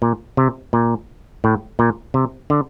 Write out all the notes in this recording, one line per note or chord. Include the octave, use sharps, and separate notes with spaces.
A#2
C3
A#2
A2
A#2
C3
D3